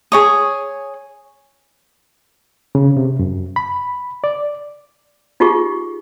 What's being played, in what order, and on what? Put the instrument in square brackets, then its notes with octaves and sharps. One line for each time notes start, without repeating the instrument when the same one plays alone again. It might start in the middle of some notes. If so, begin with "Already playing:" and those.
[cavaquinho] G#4 C#5 D#6
[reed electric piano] C#3
C3
F#2
B5
D5
[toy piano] D#4 F4 G4 G#4 C#6